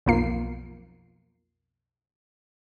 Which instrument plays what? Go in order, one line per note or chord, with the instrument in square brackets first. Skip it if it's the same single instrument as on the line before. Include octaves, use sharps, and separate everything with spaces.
[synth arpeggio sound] B1 F2 A#3 F4 C7